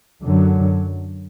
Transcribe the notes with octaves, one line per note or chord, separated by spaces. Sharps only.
F#2 D3 F#3